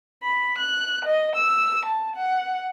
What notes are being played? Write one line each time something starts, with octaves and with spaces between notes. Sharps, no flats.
B5
F#6
D#5
E6
A5
F#5